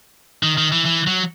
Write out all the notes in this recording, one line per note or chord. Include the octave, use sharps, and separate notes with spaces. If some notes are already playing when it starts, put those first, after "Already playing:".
D#3
D#3
E3
E3
F#3